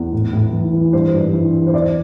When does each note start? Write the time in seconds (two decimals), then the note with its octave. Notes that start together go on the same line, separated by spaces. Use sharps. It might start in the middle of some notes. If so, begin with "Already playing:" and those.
Already playing: E2
0.13 A2
0.33 A2
0.53 E3
0.73 E3
0.93 G2 C5
1.14 G2
1.33 E3
1.53 E3
1.67 C5
1.73 E2 D5